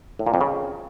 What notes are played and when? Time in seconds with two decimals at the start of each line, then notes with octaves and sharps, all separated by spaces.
0.19 A2
0.26 A#2
0.34 F2
0.41 C#3